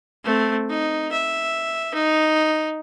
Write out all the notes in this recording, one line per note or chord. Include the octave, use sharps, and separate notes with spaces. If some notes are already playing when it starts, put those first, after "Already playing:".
A3 C4
D#4
E5
D#4